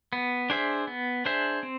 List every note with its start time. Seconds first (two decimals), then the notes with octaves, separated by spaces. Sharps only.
0.13 B3
0.50 D4 G#4 C5 E5
0.87 B3
1.25 D4 G#4 C5 E5
1.63 C4